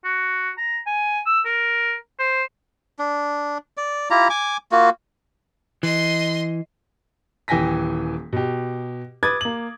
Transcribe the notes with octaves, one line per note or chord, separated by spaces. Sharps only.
F#4
A#5
G#5
E6
A#4
C5
D4
D5
E4 F4 G4 A#5
G#5 D6
A#3 F4 F#4
E3 D#5 C6
D#1 E3 G5 G#5 A#6 B6
B2 G4
B4 D6 D#6 G#6 A6
A#3 F#7